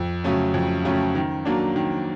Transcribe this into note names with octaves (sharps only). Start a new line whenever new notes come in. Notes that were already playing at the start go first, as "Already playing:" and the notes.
Already playing: F2
C#3 F#3 A3 C#4
F2
C#3 F#3 A3 C#4
D#3
F#3 A#3 D4
D#3